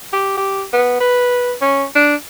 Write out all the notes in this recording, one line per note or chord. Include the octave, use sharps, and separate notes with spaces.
G4
G4
B3
B4
C#4
D4